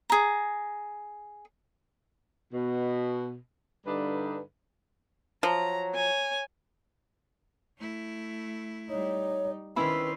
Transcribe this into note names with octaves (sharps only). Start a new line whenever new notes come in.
G#4 A#5
B2
G2 D3 G3 D4 D#4 B4
F3 F#3 A#5
C#5 G#5
A3 E4
G3 D#4 C#5
D#3 C4 C#4 E4 F4 B4 B5